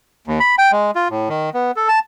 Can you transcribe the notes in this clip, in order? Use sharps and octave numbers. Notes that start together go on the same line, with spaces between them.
D#2
B5
G5
G#3
F4
A2
D#3
B3
A4
A5